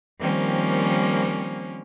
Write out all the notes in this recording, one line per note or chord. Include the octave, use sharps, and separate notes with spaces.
D#3 F3 G3 A#3 C4 C#4